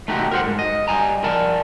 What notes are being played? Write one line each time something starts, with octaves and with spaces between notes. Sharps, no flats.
A3 D#4 F#4 G4
A#4 C5 F#5
G#2
D#5
G3 G#5 A#5
A#4 D5 A5